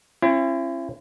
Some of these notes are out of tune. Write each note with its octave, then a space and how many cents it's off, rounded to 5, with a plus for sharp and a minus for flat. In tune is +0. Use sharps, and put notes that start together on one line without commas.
C#4 -45 E4 +40